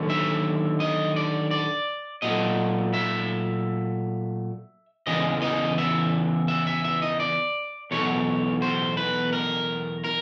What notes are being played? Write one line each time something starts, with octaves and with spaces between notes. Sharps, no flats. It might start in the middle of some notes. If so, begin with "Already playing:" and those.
Already playing: D#2 D3 F#3
E5
D#5
D5
D5
A#2 F#3 A3 D#5
E5
E2 C#3 E3 D#5
D#5
E5
E5
E5
E5
D#5
D5
E2 B2 F#3 A3 C#5
C5
B4
A#4
A#4